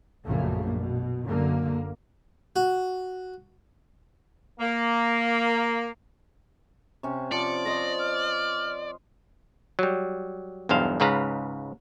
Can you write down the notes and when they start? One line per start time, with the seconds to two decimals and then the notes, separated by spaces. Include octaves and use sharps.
0.25 A#1 F#2 C#3 A3 A#3
0.77 B2
1.24 F#2 D3 A#3
2.56 F#4
4.60 A#3
7.03 C3 C#4
7.32 F3 D5 D6 C#7
7.65 C5 C#5 D#5 A#6
7.99 F6
9.79 F#3 G3
10.69 B1 E2 G2 C5 F5
11.00 C#2 G#2 C#3 B4 F5 A#5